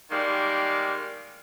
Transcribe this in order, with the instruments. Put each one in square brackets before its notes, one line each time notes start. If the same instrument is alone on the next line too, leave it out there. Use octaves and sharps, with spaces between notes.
[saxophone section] D#3 G3 G#3 A#3